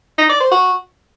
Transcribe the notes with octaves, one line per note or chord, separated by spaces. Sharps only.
D#4
D5
C5
F#4